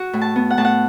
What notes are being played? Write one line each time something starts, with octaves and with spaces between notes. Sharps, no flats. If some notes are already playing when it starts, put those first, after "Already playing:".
Already playing: F#4
A2
A5
B3
F#5
A2 A5
F#5